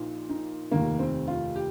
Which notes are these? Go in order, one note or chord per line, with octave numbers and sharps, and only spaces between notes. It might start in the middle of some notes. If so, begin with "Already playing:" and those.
Already playing: A#1 A#2 D#4
D#4
F1 D#2 D#3 A#3
C4
F4
G4